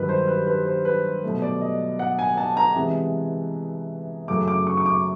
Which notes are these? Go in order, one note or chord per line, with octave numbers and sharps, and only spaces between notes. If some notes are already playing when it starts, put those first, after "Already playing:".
Already playing: G2 D#3 F#3 B4
C5
B4
B4
C5
B4
B2 F#3 A3
D5
D#5
F#5
G#5
A5
A#5
C3 E3 G#3
F#2 C#3 F#3 A3 D6
D6
C#6
C#6
D6